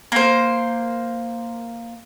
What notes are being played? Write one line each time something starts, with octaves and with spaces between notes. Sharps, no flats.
A#3 C5